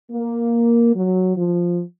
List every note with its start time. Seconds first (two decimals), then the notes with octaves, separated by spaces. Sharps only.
0.10 A#3
0.94 F#3
1.36 F3